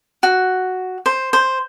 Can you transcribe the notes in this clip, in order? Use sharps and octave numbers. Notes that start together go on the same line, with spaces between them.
F#4
C5
C5